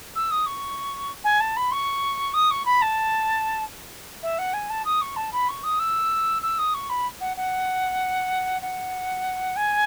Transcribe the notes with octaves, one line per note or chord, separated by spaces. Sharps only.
E6
D#6
C#6
G#5
A5
B5
C#6
D#6
C#6
B5
A5
E5
F#5
G#5
A5
D#6
C#6
A5
B5
C#6
D#6
E6
E6
D#6
C#6
B5
F#5
F#5
F#5
G#5